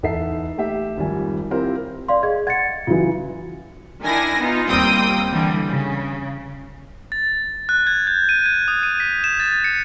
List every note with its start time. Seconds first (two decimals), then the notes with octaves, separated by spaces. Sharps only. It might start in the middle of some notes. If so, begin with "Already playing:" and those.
0.03 E2 D#4 A4 E5 C7
0.58 A3 G4 E5
0.98 G#1 F2 D#3 G3 G#5
1.51 C4 E4 F4 G4 A#4 C5
2.08 D5 F5 C6
2.23 G#4 D#5 G#6
2.47 F#5 G#6 A6 C#7
2.87 C#3 E3 F4 F#4
4.03 D#3 D4 E4 G#5 A#6
4.38 B3 D#4 F4
4.69 D#2 G3 A#3 C4 G5 D#6
5.31 D3 E3 G3
5.67 C#3
7.12 A6
7.69 F#6
7.87 G#6
8.07 G6
8.29 D#7
8.46 G#6
8.68 D#6
8.83 D#7
9.00 B6
9.24 E7
9.40 A6
9.64 C#7